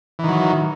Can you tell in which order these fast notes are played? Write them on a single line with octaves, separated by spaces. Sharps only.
E3 D#3 F#3